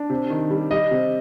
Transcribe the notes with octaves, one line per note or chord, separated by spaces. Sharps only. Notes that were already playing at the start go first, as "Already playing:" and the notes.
Already playing: D4
C3
D#3
G3
G3 D#5
C3